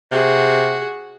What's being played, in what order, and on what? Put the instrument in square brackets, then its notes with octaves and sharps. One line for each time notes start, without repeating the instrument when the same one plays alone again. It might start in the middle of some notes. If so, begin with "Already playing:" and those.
[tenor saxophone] C3 [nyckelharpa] F#4 G#4